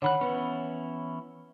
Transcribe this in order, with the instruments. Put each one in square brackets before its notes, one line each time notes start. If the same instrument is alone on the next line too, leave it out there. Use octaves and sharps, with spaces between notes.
[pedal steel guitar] D3 D#3 F#6 [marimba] C#5 F#5 B5
[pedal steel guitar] E3 B3 C#4 [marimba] B4